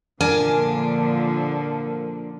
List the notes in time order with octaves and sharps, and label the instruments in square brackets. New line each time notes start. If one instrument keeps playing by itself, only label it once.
[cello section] A#2 D3 F3 [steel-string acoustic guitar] D4 [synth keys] A#4 [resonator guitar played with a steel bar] G#5